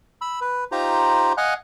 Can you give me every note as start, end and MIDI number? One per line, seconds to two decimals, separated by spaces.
0.21 0.40 83
0.21 0.40 88
0.41 0.64 71
0.72 1.33 63
0.72 1.33 65
0.72 1.33 67
0.72 1.33 72
0.72 1.33 82
1.37 1.54 75
1.37 1.54 77
1.37 1.54 78
1.37 1.54 80
1.37 1.54 90